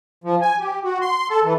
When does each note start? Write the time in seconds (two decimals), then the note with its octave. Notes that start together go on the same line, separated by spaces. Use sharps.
0.24 F3
0.41 G#5
0.60 G4
0.84 F#4
1.01 C6
1.30 A4
1.44 E3